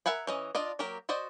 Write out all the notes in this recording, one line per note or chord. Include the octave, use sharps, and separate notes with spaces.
A#4 E5 F#5 G#5 B5
E3 C#4 D#5
D4 F4 D5 D#5
F#3 A#3 G4 A#4
F#4 C5 D5 D#5